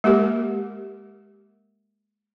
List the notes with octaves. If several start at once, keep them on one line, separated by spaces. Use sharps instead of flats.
G#3 A#3 G4 A#4